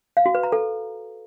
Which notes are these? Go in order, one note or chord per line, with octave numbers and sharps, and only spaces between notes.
F5
F#4
B4
A#5
A4